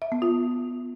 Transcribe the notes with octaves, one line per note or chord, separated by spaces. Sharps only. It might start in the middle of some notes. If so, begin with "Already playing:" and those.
E5
B3
F4